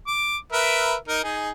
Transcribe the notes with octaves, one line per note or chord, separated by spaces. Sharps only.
D6
A#4 B4 E5
D#4 A#4
D#4 G#4